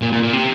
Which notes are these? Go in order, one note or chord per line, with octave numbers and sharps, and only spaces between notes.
A#2
A#2
A#2
C3